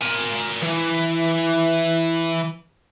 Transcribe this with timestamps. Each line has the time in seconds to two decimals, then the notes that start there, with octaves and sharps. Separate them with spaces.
0.02 A#4 G#5
0.63 E3